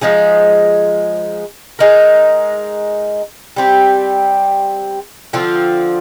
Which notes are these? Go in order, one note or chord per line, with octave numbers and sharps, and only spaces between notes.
F3 G#3 D#4 G#4
G#3 D#4 A#4
G3 C4 G4
D3 F3 C4 F4